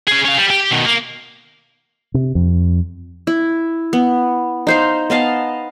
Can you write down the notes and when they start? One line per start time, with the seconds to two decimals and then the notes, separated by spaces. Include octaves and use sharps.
0.07 C#4 G#4
0.25 C#4 F5
0.37 G3
0.50 G4
0.71 B2 D#3
0.86 A#3
2.14 C3
2.35 F2
3.27 E4
3.93 B3
4.67 D#4 C5 F5
5.10 B3 D#5 F5 A5